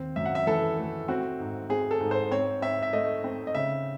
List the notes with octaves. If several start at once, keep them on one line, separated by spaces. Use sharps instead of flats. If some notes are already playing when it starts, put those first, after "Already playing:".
Already playing: D#2 C4
F#2 E5
F#5
E5
E3 A4
A3
C4 F#4
G#2
C4 G#4
A4
G#2
C5
C4 C#5
C4 E5
E5
A3 D#5
C4
D#5
C#3 E5